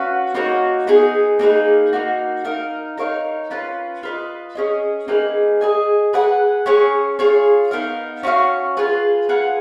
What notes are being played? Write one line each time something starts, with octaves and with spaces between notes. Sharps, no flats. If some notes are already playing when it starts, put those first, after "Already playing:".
Already playing: C#4 F#4 B4 F5
A#3 D#4 F#4 C#5
B3 D#4 G#4
A#3 D#4 G#4 B4
A#3 D#4 F#4
D#4 A#4 F5
D#4 A#4 C#5 F5
C#4 F4 B4
F4 B4 D#5
C#4 G#4 D#5
A#3 D#4 G#4 B4
G#4 D#5 G#5
G#4 B4 F#5
C#4 G#4 C#5
F4 G#4 C#5
B3 D#4 A#4 F5
C#4 F#4 C#5 F5
F4 G#4 B4
F4 G#4 B4 F#5